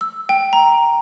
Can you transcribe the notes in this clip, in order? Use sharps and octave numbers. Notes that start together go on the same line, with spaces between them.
E6
G5
A#5